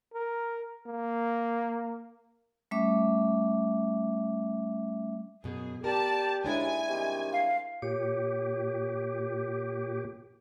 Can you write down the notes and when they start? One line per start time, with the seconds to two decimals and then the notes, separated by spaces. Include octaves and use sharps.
0.14 A#4
0.87 A#3
2.71 G3 A3 C#4 E5 D6
5.44 F#2 B2 G#4
5.84 G4 A#4 D5 A5
6.44 D#2 G#3 D4 E4 G#5
6.88 C3 D#3 G3
7.32 F5
7.82 A#2 G4 C#5